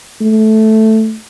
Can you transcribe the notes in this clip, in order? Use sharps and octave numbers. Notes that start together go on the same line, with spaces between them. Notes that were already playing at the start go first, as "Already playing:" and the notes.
A3